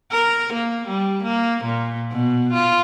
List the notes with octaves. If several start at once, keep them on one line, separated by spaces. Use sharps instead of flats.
A#4
A#3
G3
A#3
A#2
B2
F4